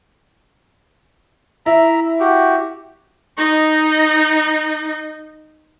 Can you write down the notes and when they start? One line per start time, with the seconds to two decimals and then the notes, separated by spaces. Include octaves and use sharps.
1.66 E4 E5 A#5
2.20 F#4 G4
3.38 D#4 D#5